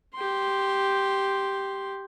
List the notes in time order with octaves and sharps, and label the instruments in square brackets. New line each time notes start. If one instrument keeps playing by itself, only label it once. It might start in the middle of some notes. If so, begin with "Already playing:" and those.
[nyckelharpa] G4 C6